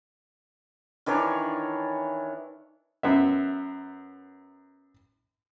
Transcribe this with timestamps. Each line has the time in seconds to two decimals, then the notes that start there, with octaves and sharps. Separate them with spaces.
1.06 D#3 E3 D4 C#5
3.03 F#2 B3 E5